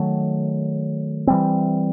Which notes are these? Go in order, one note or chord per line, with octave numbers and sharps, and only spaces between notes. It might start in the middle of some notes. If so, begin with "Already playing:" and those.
Already playing: D#3 F#3 A3
E3 G3 C4